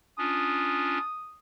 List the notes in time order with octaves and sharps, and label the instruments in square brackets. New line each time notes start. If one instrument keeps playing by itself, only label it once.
[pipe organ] C#4 D4 F4 [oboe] D#6